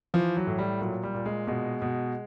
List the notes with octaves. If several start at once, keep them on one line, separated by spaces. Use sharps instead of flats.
E3 F3
F#3
A2
G3
A#2 F#3
G3
A#2
G#3
B2 G#3
B2